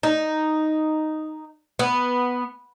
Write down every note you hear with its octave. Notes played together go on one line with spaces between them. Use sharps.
D#4
B3